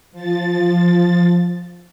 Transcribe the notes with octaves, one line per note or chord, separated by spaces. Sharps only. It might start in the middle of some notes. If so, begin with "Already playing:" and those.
F3 A6